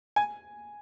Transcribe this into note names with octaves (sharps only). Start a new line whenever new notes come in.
G#5